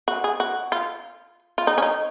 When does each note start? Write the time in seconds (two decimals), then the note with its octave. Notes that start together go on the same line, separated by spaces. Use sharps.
0.08 F#4
0.24 G#4
0.40 F#4
0.72 F4
1.58 F4
1.67 D#4
1.78 C#4
1.82 D#4